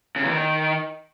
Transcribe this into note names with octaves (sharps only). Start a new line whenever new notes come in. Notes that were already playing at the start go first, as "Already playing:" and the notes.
C#3
E2
D#3